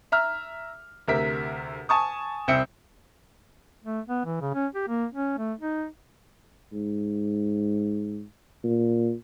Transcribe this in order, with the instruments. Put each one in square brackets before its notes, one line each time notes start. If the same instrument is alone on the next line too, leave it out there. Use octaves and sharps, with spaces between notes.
[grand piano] E5 A#5 F6
D2 C3 A#4 E5 B6
G#5 A5 C#6 D#6
C2 C4 E5 C#7
[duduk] A3
B3
E3
C#3
C#4
G4
A#3
C#4
A3
D#4
[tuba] G#2
A#2